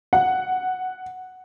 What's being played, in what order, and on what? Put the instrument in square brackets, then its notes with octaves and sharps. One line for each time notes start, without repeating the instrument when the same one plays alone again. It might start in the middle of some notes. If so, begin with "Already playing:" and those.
[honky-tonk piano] F#5